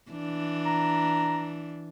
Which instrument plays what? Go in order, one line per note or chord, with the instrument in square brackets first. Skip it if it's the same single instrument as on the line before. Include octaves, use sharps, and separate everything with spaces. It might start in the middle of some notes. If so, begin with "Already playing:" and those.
[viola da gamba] E3 D4
[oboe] A#5